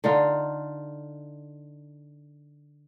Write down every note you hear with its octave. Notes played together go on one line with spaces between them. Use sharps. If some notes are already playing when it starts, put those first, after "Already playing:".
D3 D#4 F4